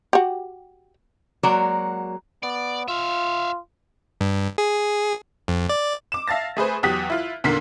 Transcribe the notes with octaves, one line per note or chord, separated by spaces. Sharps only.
F#4 G4
F#3 G#3 A#3 F#4 C#5 D5
B3 D5
F4 E5 F5
G2
G#4
F2
D5
D6 E7
E5 F5 A5 A6 A#6
A3 G#4 B4 C5
E2 F#3 G4 D#6 F#6 B6
E4 F4
E2 A#2 D3 D#3 A#3 B6